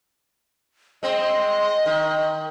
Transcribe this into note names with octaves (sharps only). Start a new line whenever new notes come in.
G#3 C4 D#5
D#3